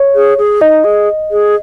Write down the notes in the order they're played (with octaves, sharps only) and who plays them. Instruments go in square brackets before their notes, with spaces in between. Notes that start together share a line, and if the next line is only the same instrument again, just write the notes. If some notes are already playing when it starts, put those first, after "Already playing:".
Already playing: [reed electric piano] C#5
[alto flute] G#4
G#4
[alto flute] D#4 [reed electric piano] D#5
[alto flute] G#4
G#4